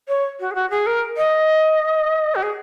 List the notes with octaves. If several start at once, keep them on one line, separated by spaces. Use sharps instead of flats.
C#5
F#4
G#4
F#4
G#4
A#4
D#5
F#4
G#4